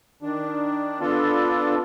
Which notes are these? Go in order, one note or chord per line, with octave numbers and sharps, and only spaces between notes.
D#3 D4
B3 D4 F4 A4